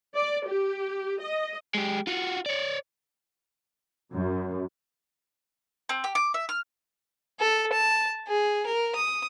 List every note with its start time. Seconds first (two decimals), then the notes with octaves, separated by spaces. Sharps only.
0.16 D5
0.48 G4
1.22 D#5
1.74 G#3 G4
2.07 F4 F#4
2.46 C#5 D5
4.13 F#2
5.89 C4
6.04 G4
6.15 D6
6.34 E5
6.49 F6
7.40 A4
7.73 A5
8.28 G#4
8.66 A#4
8.96 D#6